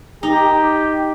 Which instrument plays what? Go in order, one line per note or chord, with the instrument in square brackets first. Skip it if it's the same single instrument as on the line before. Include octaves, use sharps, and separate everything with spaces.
[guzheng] D#4 [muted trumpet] G4